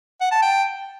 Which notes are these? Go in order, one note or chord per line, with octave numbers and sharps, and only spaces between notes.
F#5
A5
G5